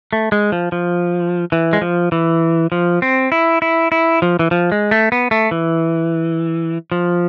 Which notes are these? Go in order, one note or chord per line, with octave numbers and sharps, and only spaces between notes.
A3
G#3
F3
F3
E3
G#3
F3
E3
F3
C4
E4
E4
E4
F3
E3
F3
G#3
A3
B3
A3
E3
F3